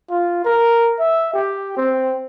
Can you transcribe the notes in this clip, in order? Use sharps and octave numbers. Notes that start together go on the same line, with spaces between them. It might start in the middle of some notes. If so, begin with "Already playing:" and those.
F4
A#4
E5
G4
C4